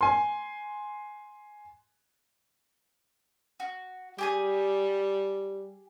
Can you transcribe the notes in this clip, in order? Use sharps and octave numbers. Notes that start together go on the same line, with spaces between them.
G#5 C6
F#4
G3 G4 G#4 G#5